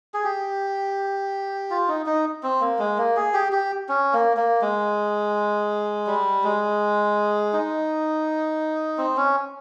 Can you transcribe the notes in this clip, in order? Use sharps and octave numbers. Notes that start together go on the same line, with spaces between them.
G#4
G4
F4
D#4
D#4
C4
A#3
G#3
A#3
G#4
G4
G4
C#4
A#3
A#3
G#3
G3
G#3
D#4
C4
C#4